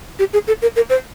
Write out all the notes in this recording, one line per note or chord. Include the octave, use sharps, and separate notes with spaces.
G4
G#4
A4
A#4
A#4
C5